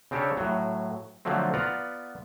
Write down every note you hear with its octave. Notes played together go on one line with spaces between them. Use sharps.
C#3 C4 D4 G4 A4 C#5
A2 F#3
D3 F3 F#3 A3 C4
B3 F4 B4 D5 F#5 A#5